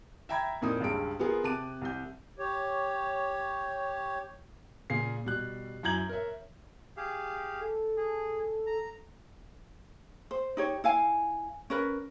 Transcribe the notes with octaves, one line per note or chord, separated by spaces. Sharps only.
E5 G5 A#5 B5 G#6
F2 A#2 A#3 D#4 E4 D#6
C#2 G2 G#3 D7
B3 F4 G#4 A#4
C3 A5 D6 F#6 D#7
C2 G6
G4 C#5
A#2 C#3 G#4 F5 C7
B2 G3 F#6
F#2 E4 A#5 G6 G#6 F#7
A#4 C#5 E5
G4 G#4 F5
A4
G#4
A#5
C5
D#4 G4 C#5
E4 F5 G#5
C#4 A#4 B4